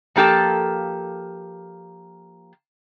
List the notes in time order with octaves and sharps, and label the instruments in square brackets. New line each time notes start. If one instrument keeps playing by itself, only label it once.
[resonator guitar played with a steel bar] F3 A#3 G4 A4 A5